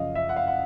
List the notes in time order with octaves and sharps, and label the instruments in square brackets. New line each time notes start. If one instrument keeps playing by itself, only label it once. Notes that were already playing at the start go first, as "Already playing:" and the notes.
Already playing: [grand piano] F#2 C#3 F3 D#5 F5
E5
F#5
F5
F#5